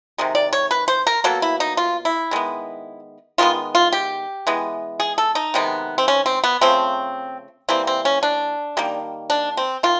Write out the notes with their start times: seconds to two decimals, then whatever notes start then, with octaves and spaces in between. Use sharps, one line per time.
0.18 C3 D#3 G#3
0.35 D5
0.53 C#5
0.71 B4
0.88 C5
1.07 A#4
1.24 B2 F#3 A#3 A4
1.42 E4
1.60 D#4
1.77 F4
2.05 E4
2.31 D#3 G#3 B3
3.38 D#3 G#3 B3 F4
3.75 F4
3.93 G4
4.47 E3 G#3 B3
5.00 G#4
5.18 A4
5.35 D#4
5.54 C3 D#3 G#3 B3
5.98 C4
6.08 C#4
6.26 C4
6.44 B3
6.61 C#3 F3 A3 C4
7.69 E3 G3 A#3 C4
7.87 C4
8.05 C#4
8.23 D4
8.77 D#3 G3 A#3
9.30 D4
9.57 C4
9.83 D#3 F4